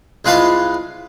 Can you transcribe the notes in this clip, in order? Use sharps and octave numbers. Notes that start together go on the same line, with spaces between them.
C2 G#3 F4 B4 F5 A5